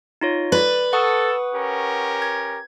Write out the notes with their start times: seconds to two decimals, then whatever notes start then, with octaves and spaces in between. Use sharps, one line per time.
0.21 D#4 F4 C#5
0.52 B4 D5
0.93 A4 F#5 C#6 D#6
1.54 C#4 G4 A#4
2.22 G#6